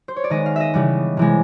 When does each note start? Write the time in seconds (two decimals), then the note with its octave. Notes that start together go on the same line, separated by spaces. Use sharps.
0.08 C5
0.16 C#5
0.24 D5
0.30 D#3 G#3 B3 D#5
0.46 F5
0.56 D#5 E5
0.74 C#3 E3 G3 B3
1.17 C3 E3 G#3